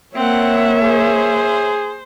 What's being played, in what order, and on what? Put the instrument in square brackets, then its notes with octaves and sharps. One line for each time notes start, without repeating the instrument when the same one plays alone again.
[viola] A#3 [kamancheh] C4 F#5 [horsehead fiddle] C#5 E5
[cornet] G#4 [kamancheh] C5